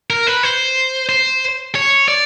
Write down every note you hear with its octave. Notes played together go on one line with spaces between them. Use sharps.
A#4
B4
C5
C5
C#5
D5